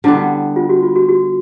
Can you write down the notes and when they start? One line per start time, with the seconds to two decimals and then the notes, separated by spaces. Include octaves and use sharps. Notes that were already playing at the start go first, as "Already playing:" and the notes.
0.04 D3 G3 B3 E4
0.56 F4
0.69 F#4
0.83 F4
0.96 F#4
1.09 F#4